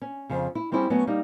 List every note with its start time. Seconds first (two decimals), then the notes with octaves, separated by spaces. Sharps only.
0.02 C#4
0.30 F2 C#3
0.55 E4
0.72 G3 C4 C#4 E4 F#4 G#4
0.90 F#3 A3 B3 C#4 F#4
1.07 G3 A#3 D#4